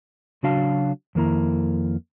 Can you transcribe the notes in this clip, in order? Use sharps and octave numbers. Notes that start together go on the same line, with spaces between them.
C#3 F#3 D4 F#4 F5 A5
F2 D#3 A#3 E4 A#5